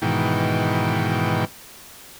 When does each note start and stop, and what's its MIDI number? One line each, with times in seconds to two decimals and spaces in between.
0.02 1.45 44
0.02 1.45 47
0.02 1.45 51
0.02 1.45 52
0.02 1.45 79